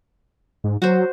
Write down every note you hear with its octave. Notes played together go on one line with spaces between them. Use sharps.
G#2
F#3 F#4 C5